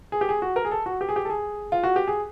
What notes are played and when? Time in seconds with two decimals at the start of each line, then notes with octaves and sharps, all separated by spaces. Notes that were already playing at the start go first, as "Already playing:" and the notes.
0.12 G#4
0.21 G4
0.29 G#4
0.42 F#4
0.56 A#4
0.65 G#4
0.71 A4
0.86 F#4
1.01 G4
1.09 G#4
1.16 G4
1.25 A4
1.30 G#4
1.72 F4
1.83 F#4
1.96 G4
2.07 G#4